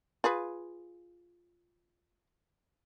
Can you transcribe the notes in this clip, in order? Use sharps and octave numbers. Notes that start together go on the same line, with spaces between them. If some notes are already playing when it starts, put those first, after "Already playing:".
F4 G#4 B4